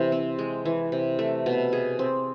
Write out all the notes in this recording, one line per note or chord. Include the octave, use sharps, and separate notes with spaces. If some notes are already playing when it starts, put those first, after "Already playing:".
Already playing: C3 E3
C4
G#3
E3
C3
A3
B2
G#4
C4